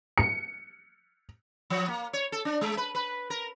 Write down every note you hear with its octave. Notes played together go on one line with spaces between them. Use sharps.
C#7
F3
A#3
C#5
A4
D4
G#3
B4
B4
A#4